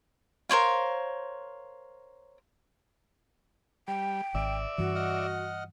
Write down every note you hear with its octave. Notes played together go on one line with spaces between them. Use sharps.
A#4 C5 C#5 F5
G3 G5
G#1 D5 E5
G2 E3 F#4
D#5 F#5 F6